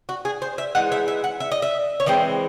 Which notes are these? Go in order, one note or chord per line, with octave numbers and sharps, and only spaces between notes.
F#4
G#4
C5
E5
E3 G#3 D#4 F#5
E5
E5
F#5
E5
D#5
E5
C#5
E3 G#3 C4 D#5